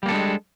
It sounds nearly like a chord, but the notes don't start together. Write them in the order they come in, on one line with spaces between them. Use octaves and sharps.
G3 A#3 A4 D4 G#3